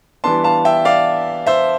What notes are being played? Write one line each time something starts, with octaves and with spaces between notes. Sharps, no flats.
E3 G3 B3 D4 A5 C6
F5 A5
E5 G5
D5 F5
C5 E5